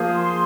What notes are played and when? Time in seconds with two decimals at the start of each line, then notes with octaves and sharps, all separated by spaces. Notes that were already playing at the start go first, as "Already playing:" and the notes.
Already playing: F3 A#3 F4 G#4 C5
0.14 C6